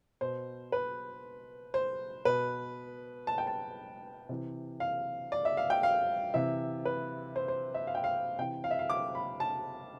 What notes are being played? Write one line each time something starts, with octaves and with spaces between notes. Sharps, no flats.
B2 C5
B4
C5
B2 B4
A5
G5
A5
C3 E3
F5
D5
E5
F5
G5
F5
C3 E3 E5
B4
C5
C5
E5
F5
G5
F5
C3 E3 G5
F5
E5
F5
D6
B5
A5